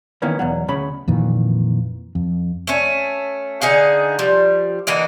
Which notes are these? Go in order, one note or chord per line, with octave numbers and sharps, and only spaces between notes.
D#3 E3 A#3 B3 C#4
E2 B2 F#3
D2 C#3 C#5 B5
F2 A#2 D#3 E3
F2
A3 C#4
D3 D#4 G#4 F5
F3 G3
D3 E3 A#3 D#4